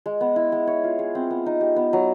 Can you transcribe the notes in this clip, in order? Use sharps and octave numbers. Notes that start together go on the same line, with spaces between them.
G#3
B3
E4
G#3
C#5
F4
G#4
C4
B3
D#4
G4
B3
F#3